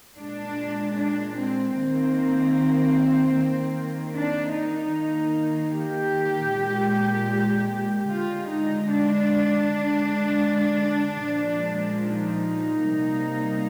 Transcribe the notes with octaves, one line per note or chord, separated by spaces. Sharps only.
A#2 G#3 D4
D4
C4
D#3 A#3 C4
D#3 A#3
D4
D#4
D#3 A#3
G4
A#2 G#3
D3 G#3 F4
D#4
D4
D3 G#3
A#2 F3 G#3
D#4
C3 G3 A#3